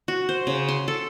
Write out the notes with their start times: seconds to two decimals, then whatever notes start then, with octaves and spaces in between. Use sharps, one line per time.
0.08 F#4
0.29 C5
0.47 C#3
0.68 C6
0.88 A4